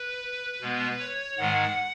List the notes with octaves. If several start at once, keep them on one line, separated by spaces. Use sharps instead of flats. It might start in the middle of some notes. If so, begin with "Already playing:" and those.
Already playing: B4
B2 G#3 B3
C#5
G#2 D#3 G#3 F#5